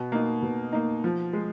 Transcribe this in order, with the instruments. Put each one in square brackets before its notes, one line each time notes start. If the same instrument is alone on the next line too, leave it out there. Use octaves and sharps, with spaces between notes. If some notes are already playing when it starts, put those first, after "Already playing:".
Already playing: [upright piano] B2
A#3 D#4
B2
A#3 D#4
F3
G#3